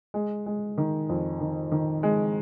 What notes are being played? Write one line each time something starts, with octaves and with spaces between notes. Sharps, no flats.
G#3
G#3
D#3
F2
D#3
D#3
G#3